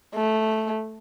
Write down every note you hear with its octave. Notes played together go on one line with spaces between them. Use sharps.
A3